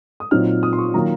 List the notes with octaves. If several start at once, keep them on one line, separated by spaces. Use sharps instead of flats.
D#6
A#2 F#3 C4 D#4 F6
D#6
C6
C#6
D#3 F#3 A#3 F4 A#5